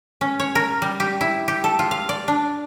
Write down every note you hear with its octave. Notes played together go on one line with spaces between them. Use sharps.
C#4
C#5
A#4
G3
G4
E4
G4
A4
F4
F5
D5
D4